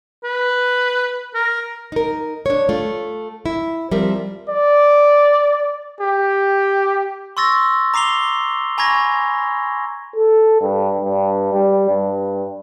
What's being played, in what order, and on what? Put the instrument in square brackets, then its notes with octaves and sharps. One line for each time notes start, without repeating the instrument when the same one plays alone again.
[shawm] B4
A#4
[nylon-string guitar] D#4 A#4
D4 C#5
A3 F4
E4
F3 G3 C4 A#4 E5
[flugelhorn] D5
G4
[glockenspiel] C6 C#6 E6 A6 A#6
A#5 D6 C7 F7 G7
G#5 A#5 B5 C#6 G#6 A#6
[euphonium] A4
G2
G2
G3
G2